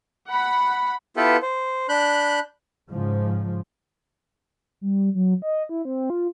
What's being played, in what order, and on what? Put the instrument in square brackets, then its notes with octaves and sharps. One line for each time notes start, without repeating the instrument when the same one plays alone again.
[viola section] F#5 B5
[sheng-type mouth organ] B3 E4 F4 G4 A4 B4
C5
D4 B5 F#6 G6
[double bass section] G#2 C#3 F3
[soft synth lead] G3
F#3
D#5
E4
C4
F4